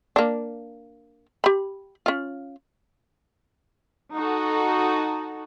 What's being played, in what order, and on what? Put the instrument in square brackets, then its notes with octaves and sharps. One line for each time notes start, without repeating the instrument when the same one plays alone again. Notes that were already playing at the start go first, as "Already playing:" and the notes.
[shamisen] A#3 D4
G4 B5
C#4 F4
[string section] D#4 F#4 A4